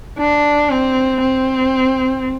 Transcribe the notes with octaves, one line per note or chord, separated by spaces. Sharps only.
D4
C4
C4